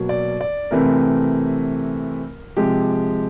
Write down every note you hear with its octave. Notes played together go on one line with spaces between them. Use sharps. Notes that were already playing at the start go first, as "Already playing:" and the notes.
Already playing: B2 F#3 A#3
D5
D5
C3 E3 A3 C4 A#4
C3 F3 G#3 G4